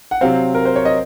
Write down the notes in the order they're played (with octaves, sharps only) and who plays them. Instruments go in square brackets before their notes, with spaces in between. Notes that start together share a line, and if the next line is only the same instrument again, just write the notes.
[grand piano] F#5
C3 F#3 C4 F5
A#4
C5
C#5
D#5